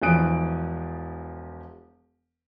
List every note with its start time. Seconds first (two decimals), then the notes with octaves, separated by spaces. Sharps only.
0.02 E1 E3 F3 D#6 F#6 D7